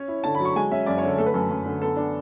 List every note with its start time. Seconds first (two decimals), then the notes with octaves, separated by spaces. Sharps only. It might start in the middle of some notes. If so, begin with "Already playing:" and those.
Already playing: C#4 C#5
0.08 E4
0.24 D3 A5
0.35 B5
0.40 F#3
0.45 C#6
0.56 G#3 G#5
0.71 C#4 E5
0.86 F#2 D5
0.98 C#5
1.03 D3 A4
1.18 A3 A4
1.26 B4
1.34 F#2 A4
1.50 F#2
1.66 D3
1.82 B3 A4
1.97 D4